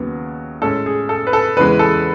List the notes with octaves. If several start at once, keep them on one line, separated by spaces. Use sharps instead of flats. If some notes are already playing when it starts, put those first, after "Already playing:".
Already playing: D#2 C#3 F#3 B3
A2 G#3 C#4 A4
G#4
A4
B4
A4
E2 C#3 E3 G#3 B4
A4